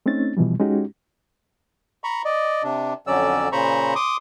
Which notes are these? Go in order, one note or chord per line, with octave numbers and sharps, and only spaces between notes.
A3 C4 C#4 D#4 A6
B2 E3 F3 G3
G#3 C#4 D#4 F#4 G4
A#5 B5 C#6
D5 D#5
C3 D4
F2 D3 F#3 C#4 D5 E6
A#2 C#3 C5 A#5 B5 C#6
C6 D6 D#6